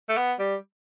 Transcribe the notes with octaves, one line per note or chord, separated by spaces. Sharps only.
A3
B3
G3